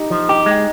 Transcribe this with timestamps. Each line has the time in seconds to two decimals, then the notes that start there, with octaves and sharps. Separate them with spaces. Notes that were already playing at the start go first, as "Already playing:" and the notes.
Already playing: D#4 G4
0.10 F3
0.29 D#4 G4
0.46 G#3